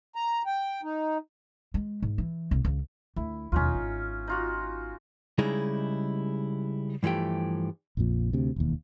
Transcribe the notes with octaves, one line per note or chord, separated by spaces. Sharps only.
A#5
G5
D#4
G#3
G#2
E3
C2
C#2
D2 E4
E1 D#2 C#4 D#4 F4
G#1
D#4 F4 F#4
C#3 G3 G#3 D#4 E4 G#4
G2 E3 F3 A3 G4
A#1 F2 A#2 F3
D2 C3
E1 D#2